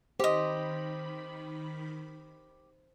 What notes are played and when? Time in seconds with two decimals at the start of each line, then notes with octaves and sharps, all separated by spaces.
0.20 D#3 G4 C5 D#5 B5